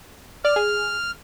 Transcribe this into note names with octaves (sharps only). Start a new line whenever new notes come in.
D5 F6
G#4